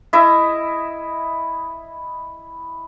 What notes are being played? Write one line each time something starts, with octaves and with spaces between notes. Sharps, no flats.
E4 D#5 E5